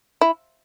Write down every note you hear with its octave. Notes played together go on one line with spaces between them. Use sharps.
E4